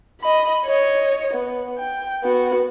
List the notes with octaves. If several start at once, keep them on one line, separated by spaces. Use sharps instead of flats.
D#5 B5
C#5 D#5
B3
G5
B3 F#4